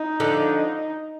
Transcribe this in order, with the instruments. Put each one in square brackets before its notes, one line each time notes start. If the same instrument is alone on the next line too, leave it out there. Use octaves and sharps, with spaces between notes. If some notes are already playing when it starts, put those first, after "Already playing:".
Already playing: [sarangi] D#4
[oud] D3 F3